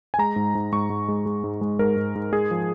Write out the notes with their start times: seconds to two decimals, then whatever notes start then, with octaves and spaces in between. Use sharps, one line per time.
0.14 G#5
0.18 G#3 A#5
0.36 G#2
0.55 G#2
0.72 G#2 C#6
0.90 G#2
1.08 G#3
1.26 G#3
1.44 G#2
1.61 G#3
1.79 G#2 A#4
1.96 G#2
2.15 G#2
2.32 G#3 G#4
2.51 F3